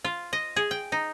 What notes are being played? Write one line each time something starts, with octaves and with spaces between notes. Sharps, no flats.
F4
D#5
G#4
G5
D#4